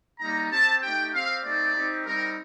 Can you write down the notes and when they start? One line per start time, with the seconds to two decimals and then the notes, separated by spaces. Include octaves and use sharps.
0.20 G3 A#3 D#4 A#5
0.51 C4 G4 A5
0.82 A3 D#4 G4 G5
1.13 C4 G4 F5
1.44 A3 C4 D#4 D5
1.75 C4 D#4 G4
2.06 G3 C4 D#4 A#4